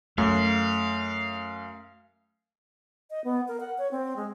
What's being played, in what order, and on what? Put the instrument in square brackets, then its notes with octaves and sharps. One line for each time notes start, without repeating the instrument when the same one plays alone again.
[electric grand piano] F#2 [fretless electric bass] A3 [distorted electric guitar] F5
[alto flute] D#5
B3
A#4
F#5
C#5
C4
G#3